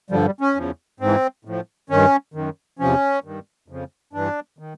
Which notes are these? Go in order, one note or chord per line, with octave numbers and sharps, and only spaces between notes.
G2 D3 F3 G3
G3
C#4
E2 C#3 F3
G#2 E3 C4
A2 F3
G2 D#3 C#4
F#2 D#3
E2 C3 F3 C#4
G2 D#3
F2 C#3 F3
G2 E3 D4
D#3